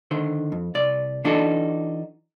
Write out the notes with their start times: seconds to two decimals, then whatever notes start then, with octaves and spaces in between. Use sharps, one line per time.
0.11 D3 D#3 C5
0.52 F2
0.75 C2 D5
1.24 E3 D4 D#4 F#4 A4